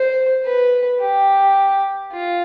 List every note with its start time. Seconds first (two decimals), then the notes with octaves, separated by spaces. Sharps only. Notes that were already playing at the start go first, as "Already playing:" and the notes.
Already playing: C5
0.45 B4
1.01 G4
2.13 F4